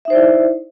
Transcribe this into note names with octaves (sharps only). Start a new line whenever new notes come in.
D#4 E4 C5 D5 E5